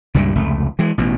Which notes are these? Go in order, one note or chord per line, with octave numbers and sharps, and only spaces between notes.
C#2 G2 A#2 G3
F1 C#2 A3
E3 G#3
A1 B2